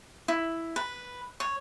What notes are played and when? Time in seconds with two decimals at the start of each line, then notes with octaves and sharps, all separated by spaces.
0.28 E4
0.76 B4
1.40 C#5